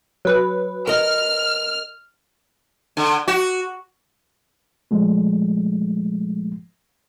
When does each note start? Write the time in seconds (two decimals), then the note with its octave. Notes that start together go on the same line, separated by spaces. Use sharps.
0.25 F#3 B4
0.87 A#4 D#5 F6
2.97 D3
3.28 F#4
4.91 A#2 F3 G#3 A3